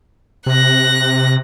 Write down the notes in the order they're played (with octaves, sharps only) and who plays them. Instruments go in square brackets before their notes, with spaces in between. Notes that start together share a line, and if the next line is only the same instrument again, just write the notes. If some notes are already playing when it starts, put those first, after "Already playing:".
[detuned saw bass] C3 [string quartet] F#6 A#6